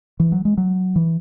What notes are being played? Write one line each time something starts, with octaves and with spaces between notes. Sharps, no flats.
E3
F#3
G#3
F#3
E3